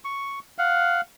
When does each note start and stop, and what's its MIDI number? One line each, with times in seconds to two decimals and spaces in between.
0.04 0.39 85
0.58 1.01 77
0.58 1.01 78